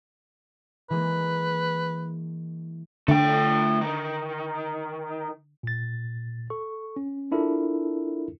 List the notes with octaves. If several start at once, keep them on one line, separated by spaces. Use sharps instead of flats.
E3 G#3 A#3 B4
D3 A3 G5
D#3
A#2 A6
A4 C#6
C#4
D4 E4 F4 A4 A#4